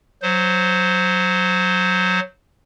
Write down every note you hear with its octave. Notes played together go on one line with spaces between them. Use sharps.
F#3 C5